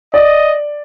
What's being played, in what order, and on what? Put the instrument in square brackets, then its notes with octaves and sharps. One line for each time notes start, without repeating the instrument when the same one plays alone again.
[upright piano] D5 [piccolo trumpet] D#5